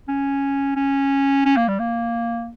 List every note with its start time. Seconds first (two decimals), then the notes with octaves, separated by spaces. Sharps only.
0.08 C#4
0.76 C#4
1.45 C#4
1.57 A#3
1.68 G3
1.79 A#3